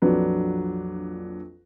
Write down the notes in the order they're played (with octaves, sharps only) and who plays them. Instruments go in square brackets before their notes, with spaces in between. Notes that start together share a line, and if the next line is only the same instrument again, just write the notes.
[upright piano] A#1 F2 F#3 D4 B4